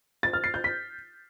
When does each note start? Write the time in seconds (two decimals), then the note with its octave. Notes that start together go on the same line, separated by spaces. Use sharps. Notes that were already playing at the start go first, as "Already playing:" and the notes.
0.23 A6
0.33 F6
0.44 C7
0.54 G6
0.64 B6